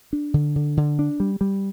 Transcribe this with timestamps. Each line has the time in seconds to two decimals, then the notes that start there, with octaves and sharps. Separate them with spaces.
0.13 D4
0.34 D3
0.56 D3
0.77 D3
0.99 D4
1.20 G3
1.41 G3